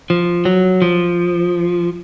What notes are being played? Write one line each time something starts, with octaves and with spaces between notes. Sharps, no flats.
F3
F#3
F3